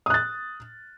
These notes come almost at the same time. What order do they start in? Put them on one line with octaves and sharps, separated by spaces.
D#6 F#6 A6